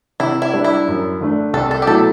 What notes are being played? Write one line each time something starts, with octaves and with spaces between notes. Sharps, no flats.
C3 E4
E4
G3 D4
E4
F#2
D3 A3 D4
C2 A4
A4
G4
B2 F#3 A3 E4 A4